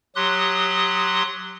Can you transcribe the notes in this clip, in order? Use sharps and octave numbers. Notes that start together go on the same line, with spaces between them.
F#3 G4 C6 D#6 F#6